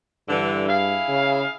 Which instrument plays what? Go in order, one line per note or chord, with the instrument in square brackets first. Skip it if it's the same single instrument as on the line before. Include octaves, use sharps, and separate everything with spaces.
[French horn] G2 [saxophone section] D3 E3
[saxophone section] E4 G#4 F5
[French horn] C#3